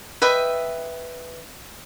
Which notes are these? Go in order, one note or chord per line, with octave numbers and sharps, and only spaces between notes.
B4 D#5 E5 G5